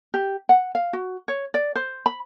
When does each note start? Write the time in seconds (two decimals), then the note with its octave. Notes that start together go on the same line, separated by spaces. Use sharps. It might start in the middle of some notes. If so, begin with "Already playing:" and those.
0.14 G4
0.49 F#5
0.75 F5
0.93 F#4
1.28 C#5
1.54 D5
1.76 C5
2.06 B5